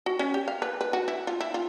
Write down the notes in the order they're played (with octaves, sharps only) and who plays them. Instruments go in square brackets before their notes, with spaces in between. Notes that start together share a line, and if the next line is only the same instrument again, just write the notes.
[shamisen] F#4
C#4
G4
F5
B4
B4
F#4
E4
F4
E4
F4